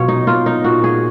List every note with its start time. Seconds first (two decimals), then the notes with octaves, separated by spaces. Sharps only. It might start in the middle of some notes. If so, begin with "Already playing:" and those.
Already playing: B2 F#3 F4 C#5
0.08 D#4
0.27 A#3 F4
0.46 D#4
0.64 A#2 F#4
0.84 G#4